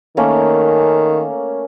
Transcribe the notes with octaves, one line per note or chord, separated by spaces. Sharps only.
D#3 A3 A#3 C#4